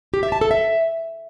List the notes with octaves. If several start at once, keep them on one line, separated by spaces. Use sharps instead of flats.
G4
E5
A5
A4
E5